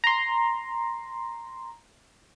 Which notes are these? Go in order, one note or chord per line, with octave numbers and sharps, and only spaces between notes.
A#5 C6